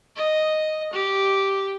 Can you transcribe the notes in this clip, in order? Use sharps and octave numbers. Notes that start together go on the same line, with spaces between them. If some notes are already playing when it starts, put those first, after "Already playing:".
D#5
G4